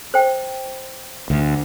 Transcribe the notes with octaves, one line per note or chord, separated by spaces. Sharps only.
C5 G5
D2